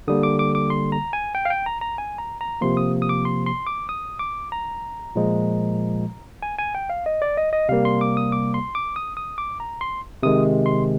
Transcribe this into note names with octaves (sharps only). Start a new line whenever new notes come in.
D3 G3 A#3 D#6
D6
D6
D6
C6
A#5
G#5
G5
F5
G5
A#5
A#5
G#5
A#5
A#5
C3 F3 A#3 C6
D#6
D#6
D6
C6
C6
D6
D#6
D6
A#5
A#2 F3 G#3
G#5
G#5
G5
F5
D#5
D5
D#5
D#5
C3 G3 A#3 F5
C6
D6
D#6
D6
C6
D6
D#6
D#6
D6
A#5
C6
C3 D#3 G#3 D#6
C6